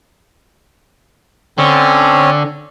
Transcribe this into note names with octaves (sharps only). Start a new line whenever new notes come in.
D3 C4 C#4 C#5